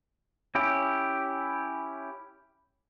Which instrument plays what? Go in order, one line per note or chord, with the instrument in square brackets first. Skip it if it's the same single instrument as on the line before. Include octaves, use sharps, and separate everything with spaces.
[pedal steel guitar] C#4 E4 G4